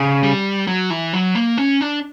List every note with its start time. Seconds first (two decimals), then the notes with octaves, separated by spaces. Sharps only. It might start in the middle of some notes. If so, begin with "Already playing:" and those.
Already playing: C#3
0.23 G3
0.67 F#3
0.90 E3
1.13 F#3
1.35 A#3
1.58 C#4
1.81 D4